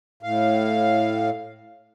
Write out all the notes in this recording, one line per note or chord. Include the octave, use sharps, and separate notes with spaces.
A2 F5